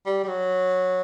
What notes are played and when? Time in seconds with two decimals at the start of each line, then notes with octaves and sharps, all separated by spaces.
0.06 G3
0.24 G3
0.28 F#3